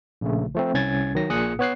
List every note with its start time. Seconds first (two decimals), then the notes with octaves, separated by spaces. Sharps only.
0.21 A#1 C#3 A3
0.55 F3 A3 C4
0.74 C2 C#4 G#6 A6
1.15 D#3 F#3 A#6
1.29 A#1 A#2 G#4 D#6 F#6 C#7
1.59 B3 C#5 F#6 C7